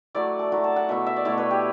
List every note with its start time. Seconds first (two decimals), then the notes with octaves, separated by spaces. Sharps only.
0.15 F#3 A3 E4 D5
0.39 A5
0.52 F#3 A3 E4
0.64 A5
0.76 F#5
0.89 B2 A3 E4 E5
1.06 E5
1.16 D5
1.25 B2 A3 E4 C#5
1.38 B4
1.51 G4